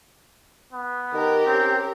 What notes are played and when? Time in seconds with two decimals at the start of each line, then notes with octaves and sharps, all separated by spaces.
0.73 B3
1.13 D#3 G4 A#4
1.47 C4 C#4